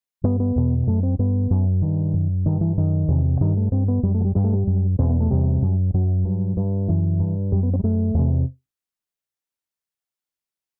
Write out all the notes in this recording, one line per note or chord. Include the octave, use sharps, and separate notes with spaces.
G2 B3
B3
E2 B2
F#2 A3
C4
G2 B3
F#2
G2 D#3
F#2
G2 D#3
E3
F#2 D#3
E2 C3
G2 D#3
A3
G2 C4
B3
F#2 G3
A3
F#3
G3
G2 G3
A3
G3
F#2
E2 B2 C4
B3
A3
E2 C3 G3
F#2
F#2 F#3
G2
G2
F#2 E3
G2
F#2 G3
B3
C4
G3
F#2 A3
E2 C3